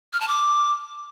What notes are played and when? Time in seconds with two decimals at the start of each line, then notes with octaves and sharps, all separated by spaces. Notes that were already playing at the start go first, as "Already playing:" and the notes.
0.13 F6
0.21 A5
0.28 D6